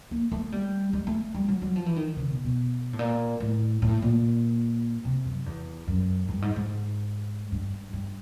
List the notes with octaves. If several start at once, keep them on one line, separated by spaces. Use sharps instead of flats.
A#3
A3
G3
G#3
A3
G3
F#3
F#3
F3
E3
D#3
C#3
B2
B2
A2
A#2
A2
A2
A#2
C3
F#2
E2
F#2
G2
G#2
G#2
G2
G2